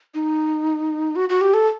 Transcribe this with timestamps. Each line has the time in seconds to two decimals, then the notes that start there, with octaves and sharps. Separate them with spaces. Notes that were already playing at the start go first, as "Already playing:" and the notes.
0.14 D#4
1.16 F#4
1.29 F#4
1.41 G4
1.54 A4